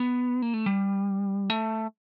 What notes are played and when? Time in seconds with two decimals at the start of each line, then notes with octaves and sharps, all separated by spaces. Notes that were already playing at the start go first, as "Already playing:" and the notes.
Already playing: B3
0.42 A#3
0.54 A3
0.66 G3
1.50 A3